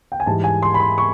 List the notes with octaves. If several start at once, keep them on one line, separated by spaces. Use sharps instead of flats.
G5
G#5
G#2 E3 G3 A5
G#5
C6
B5
C6
C#6